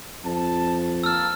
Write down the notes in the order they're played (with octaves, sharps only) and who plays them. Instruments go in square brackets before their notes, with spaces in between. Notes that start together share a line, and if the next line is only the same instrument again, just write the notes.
[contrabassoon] F2 [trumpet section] A5
[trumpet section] A#3 A5 [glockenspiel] E6 F6